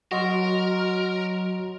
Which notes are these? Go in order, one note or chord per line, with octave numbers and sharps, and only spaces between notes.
F#3 F#4 A#4 D#5 C6